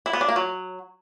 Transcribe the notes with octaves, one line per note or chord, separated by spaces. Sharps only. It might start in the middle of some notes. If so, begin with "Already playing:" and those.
E4
B3
D4
A#3
F#3